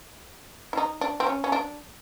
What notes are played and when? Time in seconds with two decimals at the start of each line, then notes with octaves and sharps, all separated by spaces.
0.73 E4
0.77 D#4
1.01 D4
1.20 C4
1.27 C#4
1.44 C#4
1.52 D4